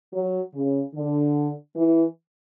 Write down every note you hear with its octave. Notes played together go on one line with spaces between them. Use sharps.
F#3
C#3
D3
E3